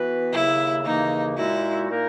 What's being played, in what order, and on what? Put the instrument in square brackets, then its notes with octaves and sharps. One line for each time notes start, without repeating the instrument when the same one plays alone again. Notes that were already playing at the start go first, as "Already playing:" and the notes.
Already playing: [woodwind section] E3 B3 F#4 B4
[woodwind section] D#2 C#3 F#3 A#3 [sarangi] E4
[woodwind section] D#2 C#3 E3 A#3 [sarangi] D#4
[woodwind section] A#2 G#3 D#4 F#4 [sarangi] E4
[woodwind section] A#2 A#3 D#4 A#4